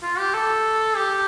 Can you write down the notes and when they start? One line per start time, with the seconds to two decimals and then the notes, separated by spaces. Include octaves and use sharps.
0.02 F4
0.18 G4
0.34 A4
0.96 G4